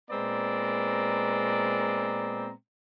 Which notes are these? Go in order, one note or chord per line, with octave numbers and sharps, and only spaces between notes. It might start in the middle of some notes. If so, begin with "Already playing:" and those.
A#2 G#3 B3 C4 D5 A#5